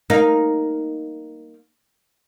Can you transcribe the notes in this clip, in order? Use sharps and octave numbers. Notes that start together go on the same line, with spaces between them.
A#3 D#4